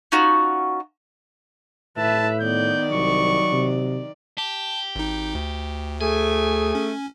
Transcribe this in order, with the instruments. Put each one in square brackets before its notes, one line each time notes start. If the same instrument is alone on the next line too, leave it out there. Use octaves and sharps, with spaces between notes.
[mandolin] C#4 D#4 F4 F#4
[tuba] A2 [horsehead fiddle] B4 E5 [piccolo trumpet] A5
[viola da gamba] D#3 D5 [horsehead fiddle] B3 [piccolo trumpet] G6
[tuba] C2 [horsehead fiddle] F#3 [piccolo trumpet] C#6
[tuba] C3
[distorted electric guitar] G4 [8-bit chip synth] A5
[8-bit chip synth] G#1 D#4
D2
[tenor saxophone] A3 [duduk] G#4 [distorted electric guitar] G#5
[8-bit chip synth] C#4